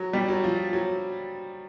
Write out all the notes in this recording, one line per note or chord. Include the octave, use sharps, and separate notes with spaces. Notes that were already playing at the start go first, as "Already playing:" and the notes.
Already playing: F#3
G3
F#3
F3
F#3